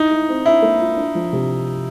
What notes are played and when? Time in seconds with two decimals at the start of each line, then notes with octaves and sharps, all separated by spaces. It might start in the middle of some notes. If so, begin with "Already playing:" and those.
Already playing: D#4 E4
0.10 E4
0.29 C4
0.46 D4 E4
0.62 A#3
0.80 F4
0.97 D4
1.15 F3
1.33 C3